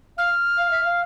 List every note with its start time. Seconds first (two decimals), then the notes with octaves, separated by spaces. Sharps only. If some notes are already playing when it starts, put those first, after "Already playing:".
0.17 F5 F6
0.57 F5
0.70 E5
0.84 F5